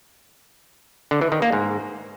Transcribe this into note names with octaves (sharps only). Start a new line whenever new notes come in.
D3
E3
D#3
A#3
G#2